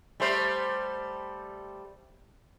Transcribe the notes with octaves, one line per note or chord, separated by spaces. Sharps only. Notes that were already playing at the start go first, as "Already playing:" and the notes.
G3 A3 C5